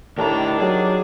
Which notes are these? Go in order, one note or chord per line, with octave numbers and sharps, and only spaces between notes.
D2 A2 D#3 G3 D4 A#5
F#3 G#4